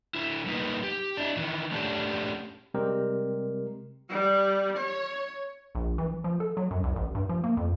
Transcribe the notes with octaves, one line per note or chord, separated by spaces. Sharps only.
D3 E4
G3 A#3 D#4 B4
G4
D4 E4
D#3 E3
A3 C#4 D4 G4
C3 G3 G#3 C4 G4 A#4
G3
C#5
A#1
E3
F3
A4
F#3
F#2
C2
A1
G2
F3
A#3
F2